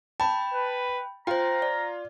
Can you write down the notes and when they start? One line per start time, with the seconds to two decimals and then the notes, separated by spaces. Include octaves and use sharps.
0.20 G5 A5 B5
0.54 B4
1.27 F4 C5 G5 A#5
1.62 D5